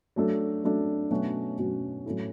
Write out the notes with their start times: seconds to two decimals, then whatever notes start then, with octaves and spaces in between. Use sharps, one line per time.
0.16 F#3 A3 D4 A4
0.64 F#3 A3 D4 A4
1.11 B2 F#3 A3 C#4 F#4
1.58 B2 F#3 A3 C#4 F#4
2.06 A2 F#3 C#4 E4 A4